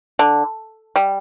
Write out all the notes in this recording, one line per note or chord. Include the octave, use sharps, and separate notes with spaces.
D3
G3